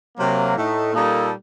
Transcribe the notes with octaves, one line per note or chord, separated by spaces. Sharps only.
C3 F#3 A#3
A2 A3 D#4
A#2 G3 A#3 D#4 A4